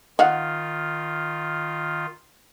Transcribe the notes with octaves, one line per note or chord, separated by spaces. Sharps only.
D#3 D#4 F4 F5 F#5